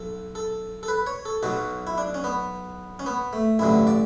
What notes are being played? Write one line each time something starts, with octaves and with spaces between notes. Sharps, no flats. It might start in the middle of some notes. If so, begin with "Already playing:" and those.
Already playing: B1 A4
A4
A4
B4
C#5
A4
B1 B2 F#3 F#4
E4
D4
C#4
B3
C#4
B3
A3
A1 G2 D3 F#3 E4
D5